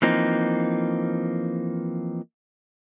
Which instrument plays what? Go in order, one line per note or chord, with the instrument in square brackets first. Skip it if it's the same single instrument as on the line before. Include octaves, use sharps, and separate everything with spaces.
[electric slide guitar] E3 F3 A#3 C4 D#4